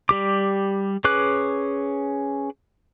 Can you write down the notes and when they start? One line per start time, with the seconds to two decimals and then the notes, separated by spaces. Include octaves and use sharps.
0.09 G3 G4 D6
1.04 C#4 G#4 B4 D6 F#6